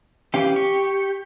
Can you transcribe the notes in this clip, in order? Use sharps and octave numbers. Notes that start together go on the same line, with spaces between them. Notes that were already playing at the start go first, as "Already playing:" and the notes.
E3 C#4 G4 F5
C#6